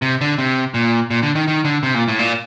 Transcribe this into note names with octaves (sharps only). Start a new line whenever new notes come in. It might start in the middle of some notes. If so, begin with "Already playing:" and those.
C3
D3
C3
A#2
A#2
D3
D#3
D#3
D3
C3
A#2
A2
A#2